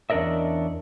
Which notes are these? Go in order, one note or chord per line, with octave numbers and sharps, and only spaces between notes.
E2 C#4 D4 A#4 D#5 E5